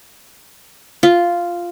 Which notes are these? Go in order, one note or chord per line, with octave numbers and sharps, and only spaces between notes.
F4